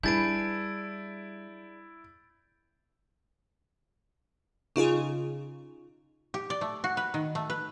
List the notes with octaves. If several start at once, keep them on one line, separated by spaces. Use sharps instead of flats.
G3 D4 E4 G#4 B4 G6 A6 D7
C#3 D#4 F4 G#4
G4
D5
A3
F#4
B4
D#3
A3
B4